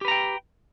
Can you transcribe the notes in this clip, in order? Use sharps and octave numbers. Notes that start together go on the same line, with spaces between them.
G4 B4 G5 A#5